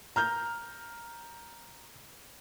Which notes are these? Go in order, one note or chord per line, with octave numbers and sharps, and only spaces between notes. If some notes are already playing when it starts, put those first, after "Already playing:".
A#5 F6 G6